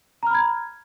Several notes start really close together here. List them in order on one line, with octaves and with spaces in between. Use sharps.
A#5 F6 B5 G#6